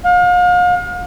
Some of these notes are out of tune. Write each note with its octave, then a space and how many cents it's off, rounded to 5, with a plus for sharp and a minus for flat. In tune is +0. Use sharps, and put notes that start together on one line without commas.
F5 +40